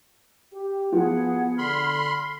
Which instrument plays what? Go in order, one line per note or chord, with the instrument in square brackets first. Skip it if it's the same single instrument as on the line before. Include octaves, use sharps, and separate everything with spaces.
[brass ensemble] G4
[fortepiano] F3 [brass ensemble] B3 [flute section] G#4 F#5
[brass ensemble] D3 [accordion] B5 C6 [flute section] F6